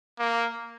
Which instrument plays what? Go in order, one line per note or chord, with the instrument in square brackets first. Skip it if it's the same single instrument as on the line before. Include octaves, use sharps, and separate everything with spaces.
[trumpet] A#3